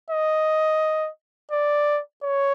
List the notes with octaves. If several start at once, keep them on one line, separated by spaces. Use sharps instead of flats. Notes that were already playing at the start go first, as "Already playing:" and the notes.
D#5
D5
C#5